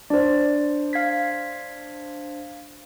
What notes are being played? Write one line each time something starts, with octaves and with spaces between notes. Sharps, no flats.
D4 C5 D5
F5 G#6 B6